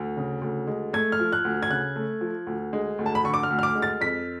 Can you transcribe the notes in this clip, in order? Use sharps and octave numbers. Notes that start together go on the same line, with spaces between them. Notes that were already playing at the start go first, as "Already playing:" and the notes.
Already playing: D2
C#3
D2
G#3
A3 G#6
F6
F3
F#6
D2
G#6
C#3 F#6
A3
F3
D2
G#3
D2
A5
B5
D3 C#6
D6
F6
D2
F6
D6
G#3
A6
F2 B6